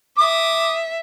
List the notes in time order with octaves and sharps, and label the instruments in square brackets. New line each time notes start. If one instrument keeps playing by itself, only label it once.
[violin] E5 [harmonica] D6 D#6